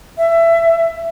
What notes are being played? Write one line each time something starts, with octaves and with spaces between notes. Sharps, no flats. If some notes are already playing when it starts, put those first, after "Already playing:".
E5